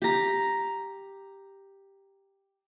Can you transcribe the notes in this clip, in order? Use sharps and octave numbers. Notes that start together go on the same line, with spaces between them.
G4 A#5